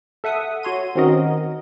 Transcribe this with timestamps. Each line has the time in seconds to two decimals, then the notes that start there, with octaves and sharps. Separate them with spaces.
0.24 A4 E5 F#5 D#6
0.63 F#4 C#5 C6 D#7
0.95 D#3 C4 C#4 F#4 A#4 D#5